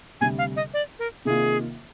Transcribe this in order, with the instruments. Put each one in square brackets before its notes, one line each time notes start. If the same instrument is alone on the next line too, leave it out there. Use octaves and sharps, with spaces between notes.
[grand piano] D2 C3 G3 [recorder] G#5
[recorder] F5
D#5
D5
A#4
[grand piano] C3 D#3 A#3 F4 [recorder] G#4